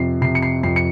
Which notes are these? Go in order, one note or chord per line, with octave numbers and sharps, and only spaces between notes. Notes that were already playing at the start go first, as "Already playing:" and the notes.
Already playing: F2 C3 C7
C3 C7
C#7
C7
F2 C7
C#7